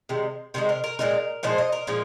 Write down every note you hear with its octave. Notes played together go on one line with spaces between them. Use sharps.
C3 D#3 G#3
C3 D#3 G#3 C5
A#4
A#4
A#2 F3 G#3 D#4 A#4
A#2 F3 G#3 D#4 C5
D#5
A#4
A#2 F3 G#3 D#4